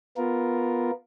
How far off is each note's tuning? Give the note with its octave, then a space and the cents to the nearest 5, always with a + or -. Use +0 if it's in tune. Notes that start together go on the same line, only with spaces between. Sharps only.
B3 +0 F4 +5 A#4 +0